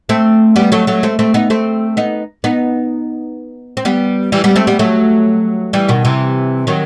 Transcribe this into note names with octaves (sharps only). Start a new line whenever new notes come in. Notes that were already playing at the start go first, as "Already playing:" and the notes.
A3 C4
G3 B3
F#3 A3
F#3 A3
A3 C4
A3 C4
B3 D#4
A3 C4
B3 D#4
B3 D#4
C4
G3 B3
E3 G3
G3 B3
A3 C4
G3 B3
F#3 A3
E3 G3
B2 D#3
C3 E3
D#3 F#3